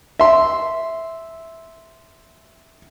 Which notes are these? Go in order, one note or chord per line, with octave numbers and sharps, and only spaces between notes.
E5 C6